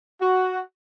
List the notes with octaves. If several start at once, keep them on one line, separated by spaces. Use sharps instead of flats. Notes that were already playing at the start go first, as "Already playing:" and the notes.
F#4